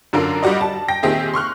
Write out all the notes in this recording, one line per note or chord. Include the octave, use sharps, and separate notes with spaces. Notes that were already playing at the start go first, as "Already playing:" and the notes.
F#2 D3 D4 F4 A#4
G3 F4 F#4 D5 D#5
A5
G5 A#6
A#2 D#3 C4 G4 G#4 E5
C6 C#6 F6 F#6